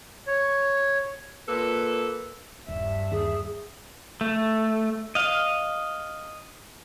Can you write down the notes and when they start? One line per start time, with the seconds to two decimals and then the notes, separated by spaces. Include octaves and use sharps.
0.27 C#5
1.48 A#2 A#3 A4 B4
2.69 D#1 G2 E5
3.11 D#2 G#4
4.21 A3
5.15 D#5 F5